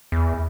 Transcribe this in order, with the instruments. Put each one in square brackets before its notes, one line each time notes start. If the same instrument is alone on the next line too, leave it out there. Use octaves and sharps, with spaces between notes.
[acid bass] E2